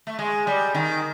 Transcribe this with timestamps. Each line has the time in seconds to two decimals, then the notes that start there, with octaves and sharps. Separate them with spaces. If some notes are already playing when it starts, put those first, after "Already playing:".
0.07 A3
0.19 G#3
0.47 G3
0.75 D#3